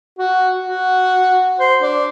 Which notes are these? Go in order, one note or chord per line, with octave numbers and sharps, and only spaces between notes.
F#4
F#4
C5
D4